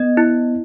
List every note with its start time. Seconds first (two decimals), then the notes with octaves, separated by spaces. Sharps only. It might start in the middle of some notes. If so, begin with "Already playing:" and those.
Already playing: B3 D#5
0.17 E4